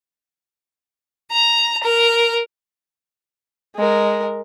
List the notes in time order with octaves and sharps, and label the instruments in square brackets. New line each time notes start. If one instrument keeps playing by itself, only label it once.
[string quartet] A#5
A#4
[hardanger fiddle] G#3 A#4